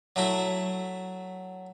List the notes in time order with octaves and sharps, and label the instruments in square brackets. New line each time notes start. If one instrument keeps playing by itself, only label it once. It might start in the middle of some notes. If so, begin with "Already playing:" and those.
[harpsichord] F#3 A3 E4 F#4